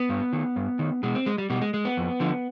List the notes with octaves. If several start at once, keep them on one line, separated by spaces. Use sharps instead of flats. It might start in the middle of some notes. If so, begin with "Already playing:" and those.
Already playing: B3
G2
D#3
G2
D#3
B2 G#3
C4
G#3
G3
B2 G3
G#3
G#3
B3
F2
D3 F3